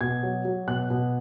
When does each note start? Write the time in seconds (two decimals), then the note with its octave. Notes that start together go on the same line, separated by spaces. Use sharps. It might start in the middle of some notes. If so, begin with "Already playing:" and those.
0.01 B2 G#6
0.23 F#3
0.45 F#3
0.67 B2 F#6
0.90 B2